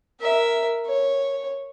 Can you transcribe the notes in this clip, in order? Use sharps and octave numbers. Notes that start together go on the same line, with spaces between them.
A#4 E5
C#5